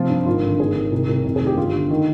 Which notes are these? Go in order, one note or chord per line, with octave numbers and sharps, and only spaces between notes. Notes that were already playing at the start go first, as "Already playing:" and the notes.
Already playing: C3 F3 F4
G2
G#1 F4
D3
G#1 G#4
G#1
C2
C2
F2 A#4
G#4
D#3
G4
G1 F4
D3
D#3